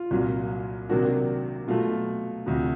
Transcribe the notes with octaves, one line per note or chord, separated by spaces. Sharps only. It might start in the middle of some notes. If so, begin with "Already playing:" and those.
Already playing: F4
C2 A#2 F#3
C3 D#3 F#3 A#3 D4 F#4
B2 F#3 A3 F4
D2 C3 F3 F#4